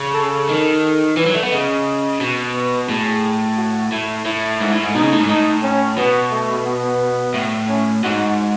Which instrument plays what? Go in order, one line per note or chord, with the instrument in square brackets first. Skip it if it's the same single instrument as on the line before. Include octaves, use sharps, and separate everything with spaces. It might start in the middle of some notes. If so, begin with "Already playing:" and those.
Already playing: [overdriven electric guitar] C#3
[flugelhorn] A4
[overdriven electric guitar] D#3 [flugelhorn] A4
[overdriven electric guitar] E3 [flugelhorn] B4
[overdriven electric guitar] F#3
A3
B3
[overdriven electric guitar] C#3 [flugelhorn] D#5
[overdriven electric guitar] B2
[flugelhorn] B4
[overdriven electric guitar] A2 [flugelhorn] G#4
[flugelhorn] F#4
[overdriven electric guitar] A2 [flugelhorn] E4
[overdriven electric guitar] A2 [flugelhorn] E4
[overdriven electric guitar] G#2
A2
G#2
[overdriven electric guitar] B2 [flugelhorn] D#4
[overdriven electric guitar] C#3
A2
G#2
[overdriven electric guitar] A2 [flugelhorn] D#4
[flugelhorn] C#4
[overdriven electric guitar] B2 [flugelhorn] B3
[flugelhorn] A3
B3
[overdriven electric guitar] A2
[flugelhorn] C#4
[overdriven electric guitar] G#2 [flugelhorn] F#4